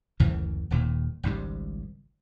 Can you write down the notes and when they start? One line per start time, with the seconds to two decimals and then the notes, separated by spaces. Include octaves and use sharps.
0.20 F#1 D2 C#3 E3
0.71 D#1 D#2 A#2
1.23 G#1 C#2 G#2 G3